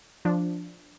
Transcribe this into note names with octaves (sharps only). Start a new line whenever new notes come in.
F3 D4